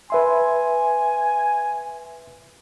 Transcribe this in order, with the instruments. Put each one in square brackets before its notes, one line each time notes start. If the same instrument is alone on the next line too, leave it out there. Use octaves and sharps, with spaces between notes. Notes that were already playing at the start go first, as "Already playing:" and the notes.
[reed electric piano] B4 E5 C6 [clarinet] G#5